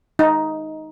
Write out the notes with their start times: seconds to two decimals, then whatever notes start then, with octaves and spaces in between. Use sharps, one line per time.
0.19 D#4